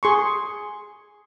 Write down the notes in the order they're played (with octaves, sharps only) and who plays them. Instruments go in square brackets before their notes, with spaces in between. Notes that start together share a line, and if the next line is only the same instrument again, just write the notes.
[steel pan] G#4 C6 C#6